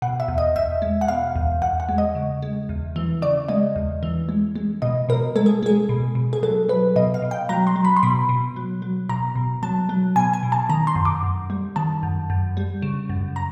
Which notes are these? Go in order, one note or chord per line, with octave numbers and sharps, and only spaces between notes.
B2 F#5
E5
E2
D#5
E2 E5
G#3
F#5
B2 F5
E2
E2 F#5
F#5
G#3
D#5
C#3
G#3
E2
E3
C#3 D5
G#3 D#5
E2
E3
G#3
G#3
B2 D#5
B2 A#4
G#3 A4
G#4
G#3 G#4
B2
B2
G#4
F#3 A4
F#3 B4
B2 D#5
F5
B2
G5
F#3 A#5
C6
F#3
B5
C6
B2 B5
B2
F#3
F#3
B2 A#5
B2
F#3 A5
F#3
B2 G#5
G#5
B2
A5
D#3 A#5
C6
F#2
D6
F#2
G3
D#3 A5
F#2
F#2
G3
C#3
F#2
A#5